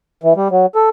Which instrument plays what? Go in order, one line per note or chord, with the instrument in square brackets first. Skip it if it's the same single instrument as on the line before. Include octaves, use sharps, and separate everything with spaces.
[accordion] E3
G3
F#3
A4